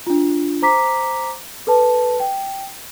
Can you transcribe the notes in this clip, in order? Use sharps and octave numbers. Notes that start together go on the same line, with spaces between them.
D4 F4
C5 A#5 D6 B6
A4 B4 A5
G5